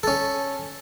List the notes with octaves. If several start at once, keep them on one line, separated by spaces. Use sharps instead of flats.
C#4 A4